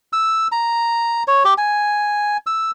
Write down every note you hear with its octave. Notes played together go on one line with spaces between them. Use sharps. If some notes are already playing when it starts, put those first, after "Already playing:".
E6
A#5
C#5
G4
G#5
E6